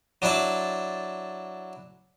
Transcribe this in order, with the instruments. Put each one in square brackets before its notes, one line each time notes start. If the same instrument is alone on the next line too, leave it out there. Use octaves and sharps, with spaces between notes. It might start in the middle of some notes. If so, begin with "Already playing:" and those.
[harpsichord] F#3 D4 E4 D5 A5